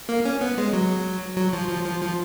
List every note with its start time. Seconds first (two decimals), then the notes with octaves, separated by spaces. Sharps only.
0.09 A#3
0.25 C#4
0.41 B3
0.58 G#3
0.73 F#3
1.37 F#3
1.53 F3
1.69 F3
1.85 F3
2.01 F3